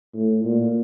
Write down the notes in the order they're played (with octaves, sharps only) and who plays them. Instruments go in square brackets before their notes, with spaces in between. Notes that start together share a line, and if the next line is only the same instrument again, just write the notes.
[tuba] A2
A#2